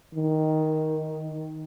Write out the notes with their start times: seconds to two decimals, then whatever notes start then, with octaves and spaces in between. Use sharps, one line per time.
0.14 D#3